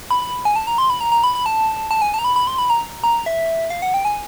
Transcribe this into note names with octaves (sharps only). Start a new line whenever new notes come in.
B5
B5
G#5
A5
A#5
C6
B5
A#5
A#5
B5
B5
A5
A5
G#5
A5
A#5
B5
B5
C6
B5
A#5
A#5
E5
F5
F#5
G5
G#5